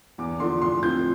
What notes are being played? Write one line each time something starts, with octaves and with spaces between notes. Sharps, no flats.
E2 D6
D3 F3 C6
A2 C6
F3 C4 F4 G6